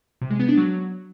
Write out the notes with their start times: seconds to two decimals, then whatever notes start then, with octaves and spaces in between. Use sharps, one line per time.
0.22 C3
0.31 G#3
0.40 B3
0.49 D4
0.58 F#3